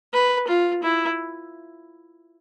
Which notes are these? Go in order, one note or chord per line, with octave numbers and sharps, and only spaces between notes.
B4
F4
E4